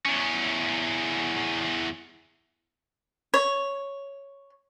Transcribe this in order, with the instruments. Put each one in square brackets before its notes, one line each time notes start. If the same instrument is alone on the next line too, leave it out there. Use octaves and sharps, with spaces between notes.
[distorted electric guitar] E2 C#4
[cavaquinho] C#5